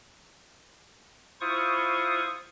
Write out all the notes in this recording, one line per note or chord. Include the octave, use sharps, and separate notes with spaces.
E4 F4 C5 C#6 D#6